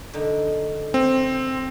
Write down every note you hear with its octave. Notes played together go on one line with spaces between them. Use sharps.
D3 D#4
C4